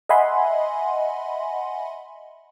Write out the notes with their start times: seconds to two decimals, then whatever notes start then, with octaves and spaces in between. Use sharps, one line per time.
0.09 D#5 E5 F#5 G#5 B5 C6